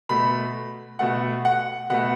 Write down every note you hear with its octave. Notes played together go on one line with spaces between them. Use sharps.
B2 A3 B5
B2 A3 F#5
F#5
B2 A3 F#5